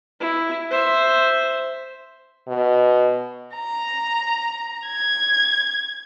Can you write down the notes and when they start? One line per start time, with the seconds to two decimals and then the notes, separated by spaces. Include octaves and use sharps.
0.20 E4
0.71 C5 E5
2.48 B2
3.55 A#5
4.87 G#6